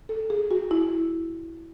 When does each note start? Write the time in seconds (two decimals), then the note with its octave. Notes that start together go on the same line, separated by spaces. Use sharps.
0.09 A4
0.30 G#4
0.51 F#4
0.71 E4